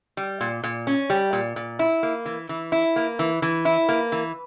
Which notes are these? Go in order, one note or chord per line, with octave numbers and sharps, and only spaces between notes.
G3
A#2
A#2
C#4
G3
A#2
A#2
E4
A#3
E3
E3
E4
A#3
E3
E3
E4
A#3
E3